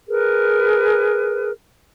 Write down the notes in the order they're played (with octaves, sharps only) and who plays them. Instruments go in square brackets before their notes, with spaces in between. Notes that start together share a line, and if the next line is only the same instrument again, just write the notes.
[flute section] G#4 A#4 B4